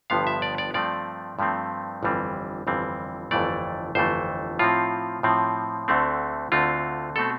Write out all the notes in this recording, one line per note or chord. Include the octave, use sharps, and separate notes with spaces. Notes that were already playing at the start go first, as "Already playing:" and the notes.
G1 G2 F3 B3 F5
E5
D5
D5
G2 F3 A3 C4 D5
G2 F3 A3 C4
G1 F2 E3 G3 C4
G1 F2 E3 G3 C4
G1 F2 E3 A3 D5
G1 F2 E3 A3 C5
A2 F3 C4 F4
A2 F3 C4
D2 D3 A3 C4
D2 D3 A3 C4 F4
B2 A3 C4 A4